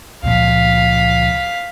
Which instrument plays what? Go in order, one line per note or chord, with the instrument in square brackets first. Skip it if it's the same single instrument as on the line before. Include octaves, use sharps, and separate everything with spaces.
[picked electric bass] C#2 A#2 F3 [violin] F5 B6